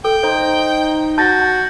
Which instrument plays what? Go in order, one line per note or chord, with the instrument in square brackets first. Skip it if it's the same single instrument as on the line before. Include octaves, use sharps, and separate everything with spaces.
[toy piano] A4 [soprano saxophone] G5
[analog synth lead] D#4 [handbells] C5
[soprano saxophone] F#4 [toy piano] A5 [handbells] G6 A6 A#6